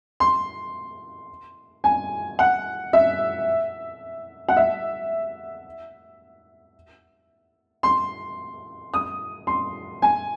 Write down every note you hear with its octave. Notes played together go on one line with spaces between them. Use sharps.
C6
G#5
F#5
E5
F#5
E5
C6
D#6
C6
G#5